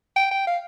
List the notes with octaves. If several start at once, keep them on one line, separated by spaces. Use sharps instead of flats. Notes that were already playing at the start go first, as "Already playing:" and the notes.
G5
G5
F5